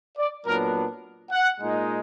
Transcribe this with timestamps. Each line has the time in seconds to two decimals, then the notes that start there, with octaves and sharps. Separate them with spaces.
0.18 D5
0.45 A#2 F#3 B3 D4 A#4
1.31 F#5
1.59 A#2 G#3 D#4